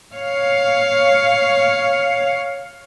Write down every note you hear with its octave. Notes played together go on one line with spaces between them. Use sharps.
C#5 F5